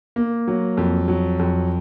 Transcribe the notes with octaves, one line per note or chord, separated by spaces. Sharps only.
A#3
F#3
F2
F#3
F2